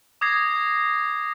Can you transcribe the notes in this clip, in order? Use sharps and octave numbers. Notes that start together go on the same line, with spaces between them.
D6 D#6 G#6 A#6 C7